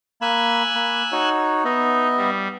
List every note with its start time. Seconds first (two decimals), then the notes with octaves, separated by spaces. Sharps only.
0.21 A#3 G#5 B5 E6 F#6
0.75 A#3 B5
1.12 D#4 F#4 C#5
1.65 B3 D#4 D#5 E5
2.17 G3